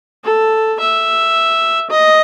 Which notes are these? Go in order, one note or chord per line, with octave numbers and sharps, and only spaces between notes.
A4
E5
D#5